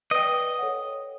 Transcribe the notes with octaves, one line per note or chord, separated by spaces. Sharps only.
B4 D5 D#5 G5
A4 C#5 F#5